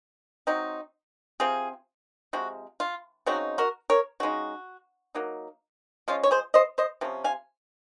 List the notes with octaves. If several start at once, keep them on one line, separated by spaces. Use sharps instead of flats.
F#3 C4 D#4
C3 F3 C4 F4 G#4
C3 F3 G#3 F#4
F4
C#3 F#3 C4 D#4 F#4
F#4 A#4
A#4 C#5
C#3 G#3 D#4 F#4
F#3 A#3 D#4
F3 G#3 C#4 F4
C#5
G#4 C5
C5 D#5
C5 D#5
C3 F3 C#4
F5 G#5